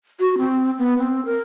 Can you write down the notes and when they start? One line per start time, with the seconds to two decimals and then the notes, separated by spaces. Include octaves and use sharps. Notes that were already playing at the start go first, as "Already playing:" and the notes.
0.20 F#4
0.38 C4
0.78 B3
0.98 C4
1.25 A#4